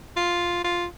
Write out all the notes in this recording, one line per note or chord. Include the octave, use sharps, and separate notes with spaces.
F4
F4